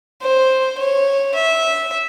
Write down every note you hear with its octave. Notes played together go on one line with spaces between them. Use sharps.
C5
C#5
E5